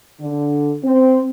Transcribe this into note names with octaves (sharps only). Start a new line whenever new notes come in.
D3
C4